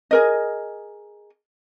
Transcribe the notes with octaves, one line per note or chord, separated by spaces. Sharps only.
G#4 A#4 D#5